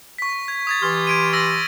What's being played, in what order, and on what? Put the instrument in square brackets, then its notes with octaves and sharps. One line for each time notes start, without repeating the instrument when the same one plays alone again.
[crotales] C#6 B6
G#6
D#6 G#6 A6
[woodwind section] E3 G4 C6 [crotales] F6 A6
[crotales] G#6 D7 D#7
E6 A#6